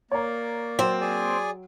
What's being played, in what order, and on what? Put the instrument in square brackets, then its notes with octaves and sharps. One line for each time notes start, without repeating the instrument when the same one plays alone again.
[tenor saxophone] A#3 [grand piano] C#5 A#5 [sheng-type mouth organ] D5
[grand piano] F#3 [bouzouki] C4
[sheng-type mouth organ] G#4 D5 G#5